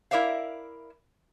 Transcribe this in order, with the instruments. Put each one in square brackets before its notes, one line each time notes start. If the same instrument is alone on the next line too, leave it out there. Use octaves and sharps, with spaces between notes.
[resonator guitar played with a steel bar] E4 A#4 D5 E5 F5